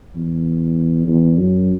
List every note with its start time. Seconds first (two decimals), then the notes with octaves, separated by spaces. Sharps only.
0.16 E2
1.07 E2
1.37 F#2